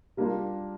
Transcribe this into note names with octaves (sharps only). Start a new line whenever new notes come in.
G3 A#3 D4 F4